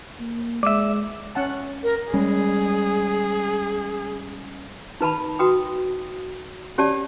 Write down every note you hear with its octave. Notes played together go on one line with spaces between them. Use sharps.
A#3
G#3 D5 E5
C#4 F#5 A5
A#4
G3 G#3 C#4 G#4
D#4 B4 A5 B5
F#4 B4 G5 D#6
C#4 G4 C#5 D5 A5